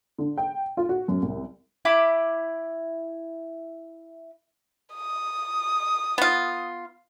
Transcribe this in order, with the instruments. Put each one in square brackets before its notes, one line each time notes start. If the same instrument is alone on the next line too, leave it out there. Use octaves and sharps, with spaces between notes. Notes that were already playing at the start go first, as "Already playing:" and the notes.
[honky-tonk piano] D3
G5
F4
F#4
F#2
C2
[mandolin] E4 B5 D6
[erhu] D#6
[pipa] B3 F4